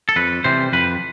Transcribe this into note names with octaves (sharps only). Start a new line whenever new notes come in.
A4
F2 B4
C3 E3 G3 C5
F2 B4